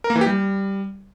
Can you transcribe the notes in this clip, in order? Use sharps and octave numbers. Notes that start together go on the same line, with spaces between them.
A#4
A#3
E3
G4
G3